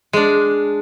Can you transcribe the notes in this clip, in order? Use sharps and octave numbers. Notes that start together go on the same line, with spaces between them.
G#3 D4